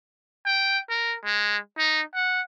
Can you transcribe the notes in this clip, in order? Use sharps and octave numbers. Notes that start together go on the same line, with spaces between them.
G5
A#4
G#3
D#4
F#5